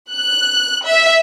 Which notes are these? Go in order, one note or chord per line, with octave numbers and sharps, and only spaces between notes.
F#6
E5